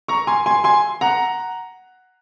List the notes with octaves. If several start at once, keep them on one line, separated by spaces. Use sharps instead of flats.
A#5 C#6
G#5 C6
G#5 C6
G#5 C6
F#5 A#5